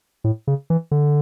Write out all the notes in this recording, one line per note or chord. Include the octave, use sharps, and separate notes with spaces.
A2
C#3
E3
D3